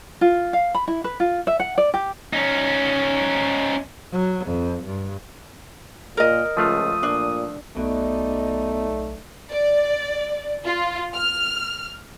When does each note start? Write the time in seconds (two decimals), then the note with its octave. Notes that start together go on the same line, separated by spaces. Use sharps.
0.21 F4
0.53 F5
0.74 B5
0.88 E4
1.04 B4
1.20 F4
1.47 E5
1.60 F#5
1.78 D5
1.94 G4
2.33 C#4 D#4
4.12 F#3
4.47 F2
4.85 G2
6.17 A#2 A#4 D#5
6.57 C#2 F3 A3 F4 D#6
7.03 A#2 D4
7.77 B1 B2 A3 D#4 D5
9.51 D5
10.64 F4
11.14 F6